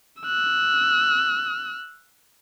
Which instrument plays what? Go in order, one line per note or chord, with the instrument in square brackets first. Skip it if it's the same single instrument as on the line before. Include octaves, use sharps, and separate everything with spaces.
[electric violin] E6 F#6